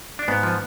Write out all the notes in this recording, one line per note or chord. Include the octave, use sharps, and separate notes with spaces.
D4
G#2 B3
F3